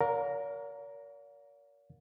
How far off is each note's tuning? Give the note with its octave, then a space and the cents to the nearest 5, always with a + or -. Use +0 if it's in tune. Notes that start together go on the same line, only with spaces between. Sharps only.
A#4 +0 C#5 +45 F5 +45